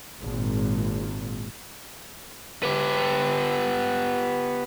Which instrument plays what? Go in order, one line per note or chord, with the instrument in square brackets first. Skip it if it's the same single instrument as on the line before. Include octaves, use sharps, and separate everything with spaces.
[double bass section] G#1 A#2
[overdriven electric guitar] B3 G4